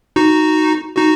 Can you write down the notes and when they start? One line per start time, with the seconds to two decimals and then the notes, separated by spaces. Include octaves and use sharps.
0.16 D#4 F#4
0.97 D#4 F#4